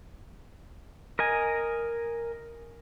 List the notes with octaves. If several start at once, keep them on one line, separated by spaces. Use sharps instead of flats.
A#4 D#5 G#5